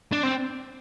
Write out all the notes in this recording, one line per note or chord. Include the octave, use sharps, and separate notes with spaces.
D4
C4